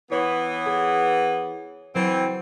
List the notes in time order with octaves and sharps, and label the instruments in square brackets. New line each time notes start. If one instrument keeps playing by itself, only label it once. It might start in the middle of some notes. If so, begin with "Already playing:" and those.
[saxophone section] E3 B3 [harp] C#5
[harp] G#4
[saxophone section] E3 C4 [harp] F#3 C5